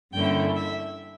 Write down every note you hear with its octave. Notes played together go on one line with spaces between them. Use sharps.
G2 D3 A#3 C#4 E4 G5
E5